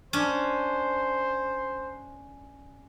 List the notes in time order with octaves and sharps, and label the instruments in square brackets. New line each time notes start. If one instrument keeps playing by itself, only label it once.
[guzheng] C#4 D4 [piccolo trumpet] C5